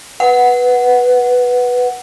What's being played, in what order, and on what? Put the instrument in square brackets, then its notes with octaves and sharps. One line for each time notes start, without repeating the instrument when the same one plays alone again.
[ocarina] B4 [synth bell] F#5